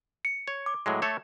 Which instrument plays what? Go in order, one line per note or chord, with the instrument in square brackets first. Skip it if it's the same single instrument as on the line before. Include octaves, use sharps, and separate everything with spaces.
[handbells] C#7
[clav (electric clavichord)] C#5
[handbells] D6
[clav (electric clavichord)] A2 F#3 G#3
A3 A4 C#5